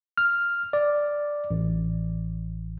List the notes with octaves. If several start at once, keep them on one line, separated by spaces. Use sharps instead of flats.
F6
D5
A1